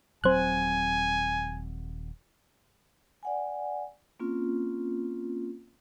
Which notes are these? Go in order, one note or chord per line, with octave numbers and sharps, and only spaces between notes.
D#1 F#3 C4 C5 G#5 F#6
D5 F#5 G#5
A#3 C4 C#4 F4